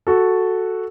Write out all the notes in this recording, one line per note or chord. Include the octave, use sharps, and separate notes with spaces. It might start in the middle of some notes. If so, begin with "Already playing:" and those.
F#4 A4